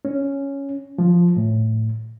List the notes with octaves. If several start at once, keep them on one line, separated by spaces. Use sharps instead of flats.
C#4
F3
A2